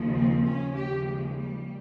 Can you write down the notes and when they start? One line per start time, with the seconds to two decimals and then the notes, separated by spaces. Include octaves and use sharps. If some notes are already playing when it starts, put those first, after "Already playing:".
Already playing: D#2 C#3 F3
0.14 C4
0.45 D#2 C#3 F3 C#4
0.76 G4
1.08 G#3
1.38 G3